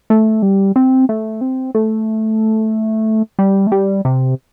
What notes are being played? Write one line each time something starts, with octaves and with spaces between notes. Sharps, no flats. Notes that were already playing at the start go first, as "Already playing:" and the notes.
A3
G3
C4
A3
C4
A3
G3
A3
G3
C3